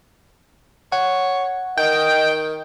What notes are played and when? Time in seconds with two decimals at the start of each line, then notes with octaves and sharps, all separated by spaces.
0.92 C#5 F#5
1.77 D#3 D#5 G5